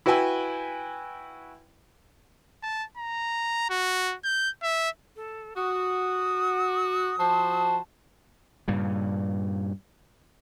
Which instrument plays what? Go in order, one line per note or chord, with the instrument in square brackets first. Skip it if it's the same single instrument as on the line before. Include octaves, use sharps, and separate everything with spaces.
[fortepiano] E4 F#4 B4 G5 G#5 E6
[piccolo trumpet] A5
A#5
F#4
G6
E5
[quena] A4
[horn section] F#4 [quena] D#6
[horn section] F3 F#4 C5 [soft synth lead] A5
[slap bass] G2 A#2 C#3